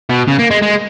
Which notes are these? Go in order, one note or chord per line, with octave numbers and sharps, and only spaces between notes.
B2
C#3
A#3
G#3
G#3